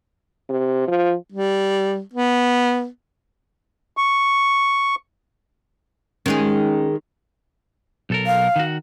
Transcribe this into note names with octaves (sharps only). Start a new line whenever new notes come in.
C3
F3
G3
B3
C#6
D#3 G#3 C#4 D#4 G#4
B1 A4 A#4
F5
D#3 F#4